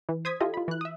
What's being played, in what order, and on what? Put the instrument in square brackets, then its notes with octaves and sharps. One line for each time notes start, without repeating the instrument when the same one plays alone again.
[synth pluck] E3
C5 D#6 G#6 B6
E4 F4 G4 A4 D#5
F4 B5
E3 F#6
E5 D#6